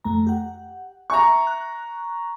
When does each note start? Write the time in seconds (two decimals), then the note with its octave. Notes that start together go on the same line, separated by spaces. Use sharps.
0.04 F2 A3 A#5
0.27 G4 F#5
1.10 E5 G#5 A#5 C#6
1.47 F#6